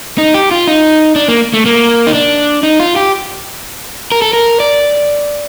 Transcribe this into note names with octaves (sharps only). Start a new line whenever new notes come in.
D#4
G4
F4
D#4
D4
A#3
A3
A#3
D#4
D4
D#4
F4
G4
A#4
A4
A#4
D5